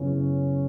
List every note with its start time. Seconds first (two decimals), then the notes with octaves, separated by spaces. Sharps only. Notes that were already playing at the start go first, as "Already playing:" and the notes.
Already playing: F#2 C#3 F#3 B3 C#4 E4